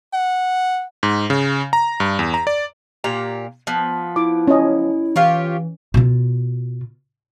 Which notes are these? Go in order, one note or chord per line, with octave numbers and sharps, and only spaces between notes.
F#5
G#2
C#3
A#5
G2
E2
A#5
D5
A#2 G4 A#5
F3 B3
E4 D6
C#4 D#5
E3 F4 G4 C#5
B2 F4